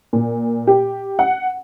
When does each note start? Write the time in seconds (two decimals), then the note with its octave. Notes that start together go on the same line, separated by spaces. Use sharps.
0.13 A#2
0.67 G4
1.19 F#5